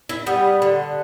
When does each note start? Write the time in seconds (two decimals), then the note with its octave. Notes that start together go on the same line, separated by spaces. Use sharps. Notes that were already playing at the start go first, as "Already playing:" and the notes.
0.09 E4
0.26 G3 B3
0.62 D3